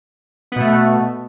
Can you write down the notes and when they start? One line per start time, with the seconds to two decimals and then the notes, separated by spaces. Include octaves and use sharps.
0.52 B3
0.56 B2
0.60 A3